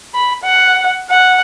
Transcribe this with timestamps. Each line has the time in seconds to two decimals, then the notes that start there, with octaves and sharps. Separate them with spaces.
0.14 B5
0.44 F#5
1.10 F#5